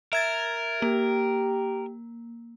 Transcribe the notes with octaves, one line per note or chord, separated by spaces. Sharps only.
A#4 E5 G#6 A6
A#3 G4